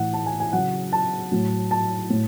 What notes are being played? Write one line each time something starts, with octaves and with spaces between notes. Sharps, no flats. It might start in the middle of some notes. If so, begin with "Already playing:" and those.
Already playing: A2 E3 F#5
A5
G#5
G#5
C#3 F#3 F#5
A5
A2 F#3
A5
A2